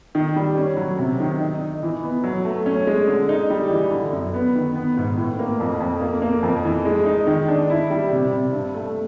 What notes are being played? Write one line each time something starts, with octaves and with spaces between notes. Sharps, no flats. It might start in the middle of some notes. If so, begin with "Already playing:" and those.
D#3
G3
C#4
F#3
C3
D#3
D#4
D#4
E3
B3
F#3
A3
C#4
G#3
D3
D#4
G3
E3
D3
F#2
B3
D#3
B3
G#2
A2
A#3
F2
F2
A#3
A#3
F2
E3
G#3
D#4
D#3
D4
E4
G3
C3
C3
G2
A3